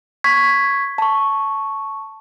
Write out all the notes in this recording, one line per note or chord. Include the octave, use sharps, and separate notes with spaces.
C#6 G#6 B6
A5 C#6